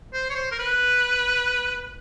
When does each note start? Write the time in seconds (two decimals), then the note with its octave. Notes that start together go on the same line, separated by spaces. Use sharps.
0.13 C5
0.30 C#5
0.35 C5
0.51 A#4
0.59 B4